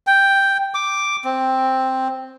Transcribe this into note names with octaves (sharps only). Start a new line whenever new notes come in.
G5
D6
C4